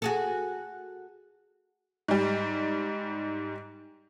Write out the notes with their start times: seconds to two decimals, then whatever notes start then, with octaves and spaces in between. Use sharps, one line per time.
0.02 F#4 G#4 A4
2.08 G#2 G3